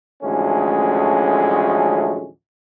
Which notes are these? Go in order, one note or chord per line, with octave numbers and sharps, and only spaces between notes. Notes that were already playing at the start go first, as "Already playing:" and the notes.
A1 D2 F3 G#3 A3 C#4